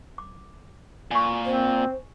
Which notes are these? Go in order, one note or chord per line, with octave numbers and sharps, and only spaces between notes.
D6
A#2 G#5 C#6
C4 C5